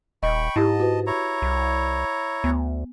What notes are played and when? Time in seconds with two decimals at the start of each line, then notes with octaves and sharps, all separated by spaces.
0.23 D#1 D#5 G5 B5 C#6
0.56 G#2 E4 G4 D#5 A5
0.80 F#4 B4
1.07 E4 C#5 A#5
1.42 C2
2.44 D2 B3